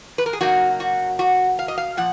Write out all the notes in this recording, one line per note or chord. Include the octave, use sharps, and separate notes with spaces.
B4
A#4
G#4
C#3 F#3 A#3 D#4 F#4
F#4
F#4
F5
D#5
F5
A#2 F3 F#5